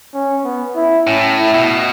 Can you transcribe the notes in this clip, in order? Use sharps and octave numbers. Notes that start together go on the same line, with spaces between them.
C#4
B3
E4
A2 C#4
E4
B2